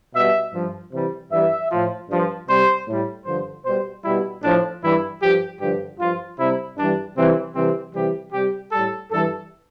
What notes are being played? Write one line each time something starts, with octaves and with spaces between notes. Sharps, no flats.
B2 G3 E5
G2 F3
C3 E3 G3
G2 E3 G3 E5
A2 F3
G2 F3
C3 G3 C5
A2
G3
G2 D3 F3 C5
B2 G3 C5
B2 G3 E4
A2 F3 D4
G2 E3 G3 E4
G2 F3 G4
G2 D3 F3 G4
G2 F3 F4
C3 G3 E4
G2 E3 G3 D4
C3 E3 G3 C4
C3 E3 G3 C4
C3 E3 G3 G4
C3 G3 G4
A2 G3 A4
G2 E3 G3 A4